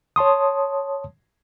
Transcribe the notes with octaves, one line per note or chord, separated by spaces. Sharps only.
C#5 A5 C6 D#6